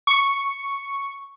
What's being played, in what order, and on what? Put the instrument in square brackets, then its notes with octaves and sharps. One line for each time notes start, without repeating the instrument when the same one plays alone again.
[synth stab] C#6